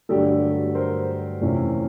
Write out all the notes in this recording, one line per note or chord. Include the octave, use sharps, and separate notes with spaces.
G2 D3 F#3 A3 D4 G4 A4
A#4 C5
F2 C3 E3 A3 C#4